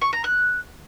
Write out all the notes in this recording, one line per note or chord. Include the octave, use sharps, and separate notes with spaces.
C#6
A#5
F#6